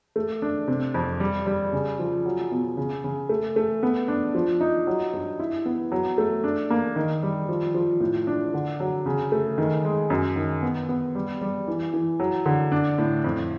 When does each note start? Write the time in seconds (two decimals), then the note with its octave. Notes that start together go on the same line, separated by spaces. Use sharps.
0.16 A3
0.42 D4
0.68 C3
0.94 F2
1.20 G3
1.46 G3
1.73 C#3
1.99 F3
2.26 F#3
2.51 B2
2.77 C#3
3.04 C#3
3.29 A3
3.56 A3
3.83 B3
4.08 D4
4.35 F3
4.61 D#4
4.87 F#3
5.13 G2
5.40 E4
5.66 B3
5.92 F#3
6.18 A3
6.44 D4
6.70 A#3
6.96 D#3
7.23 G3
7.49 F3
7.74 F3
8.00 A2
8.27 D4
8.54 D3
8.80 F#3
9.06 C#3
9.32 A3
9.58 D#3
9.85 G#3
10.10 F#2
10.36 D#3
10.63 B3
10.89 B3
11.15 G3
11.41 G3
11.68 E3
11.94 E3
12.20 F#3
12.46 D3
12.72 D4
12.98 A2
13.24 F2